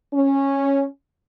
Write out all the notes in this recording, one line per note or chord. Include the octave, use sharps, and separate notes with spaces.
C#4